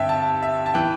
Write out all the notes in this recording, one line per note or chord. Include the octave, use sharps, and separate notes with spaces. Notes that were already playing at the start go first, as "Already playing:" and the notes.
Already playing: G2 D3 C4 E5 G5
A5
E5
A5
E3 G5